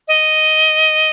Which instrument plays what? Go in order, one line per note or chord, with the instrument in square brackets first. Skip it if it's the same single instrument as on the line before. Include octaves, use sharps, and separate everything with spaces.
[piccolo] D#5